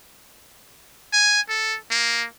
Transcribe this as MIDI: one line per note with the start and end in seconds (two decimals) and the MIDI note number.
1.13 1.41 80
1.49 1.77 69
1.91 2.26 58